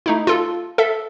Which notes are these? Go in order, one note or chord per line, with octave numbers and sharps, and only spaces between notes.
A3 D#4 E4
F4 A4
A4 E5